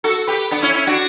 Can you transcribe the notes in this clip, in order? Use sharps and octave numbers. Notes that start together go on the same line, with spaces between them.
F#4 A4
G4 B4
B3 D4
C#4 E4
C#4 E4
D4 F#4